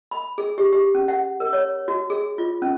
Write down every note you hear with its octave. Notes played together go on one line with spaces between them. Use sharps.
B5
G#4
G4
G4
C#4
F#5
A#4
C#5
F#4
G#4
F4
C#4